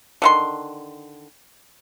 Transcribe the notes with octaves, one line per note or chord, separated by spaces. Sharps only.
D3 D#3 C6